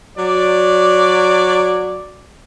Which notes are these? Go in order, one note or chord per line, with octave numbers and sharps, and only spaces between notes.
F#3 D5